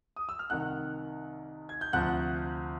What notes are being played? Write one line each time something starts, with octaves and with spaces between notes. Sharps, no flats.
D#6
E6
F6
C2 C3 D#3 F#5 F#6
G#6
G6
D2 C3 F3 F#5 F#6